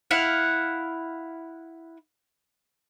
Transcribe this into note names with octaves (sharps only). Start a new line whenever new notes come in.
E4 F5 F#5